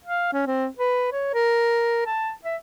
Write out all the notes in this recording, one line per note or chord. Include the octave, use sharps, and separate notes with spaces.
F5
C#4
C4
B4
C#5
A#4
A5
E5